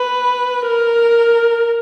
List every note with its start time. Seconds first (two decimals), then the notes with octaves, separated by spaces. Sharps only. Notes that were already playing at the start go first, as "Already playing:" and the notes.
Already playing: B4
0.67 A#4